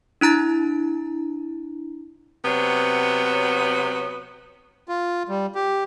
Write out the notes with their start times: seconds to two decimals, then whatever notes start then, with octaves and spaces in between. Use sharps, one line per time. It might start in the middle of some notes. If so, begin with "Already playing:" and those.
0.21 D4 E4 A#5 A6
2.45 C3 F#3 B3
4.88 F4
5.29 G3
5.55 G4